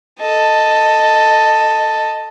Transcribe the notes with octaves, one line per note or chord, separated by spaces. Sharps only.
A4 D#5